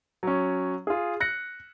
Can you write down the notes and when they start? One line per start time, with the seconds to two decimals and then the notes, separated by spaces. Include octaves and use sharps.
0.23 F#3 C#4
0.87 F4 G#4
1.20 F#6 A#6 C#7